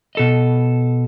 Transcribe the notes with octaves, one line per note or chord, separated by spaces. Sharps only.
B2 A4 D#5